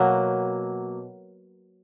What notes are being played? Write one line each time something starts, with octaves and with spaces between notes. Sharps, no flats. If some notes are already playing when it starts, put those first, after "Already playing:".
Already playing: B2 F#3 A#3